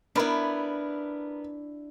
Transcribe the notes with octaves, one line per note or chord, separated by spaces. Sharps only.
B3 D4 E4 A#4 B4